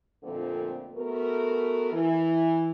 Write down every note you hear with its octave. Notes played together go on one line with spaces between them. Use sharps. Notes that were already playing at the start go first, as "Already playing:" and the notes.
F2 A#2 D3 F3 A3 C4
A3 B3 F#4 A#4
E3